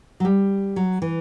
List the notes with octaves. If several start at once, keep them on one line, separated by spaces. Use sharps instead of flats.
F#3
G3
F#3
E3